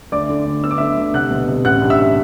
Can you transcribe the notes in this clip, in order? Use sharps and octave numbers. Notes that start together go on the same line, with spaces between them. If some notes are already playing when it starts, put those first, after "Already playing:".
D2 D5 D6
D3
D2
B3 E6
D6
D3 E5 E6
D2
C2 F#5 F#6
B2
C2
A1 F#5 F#6
G2
E5 E6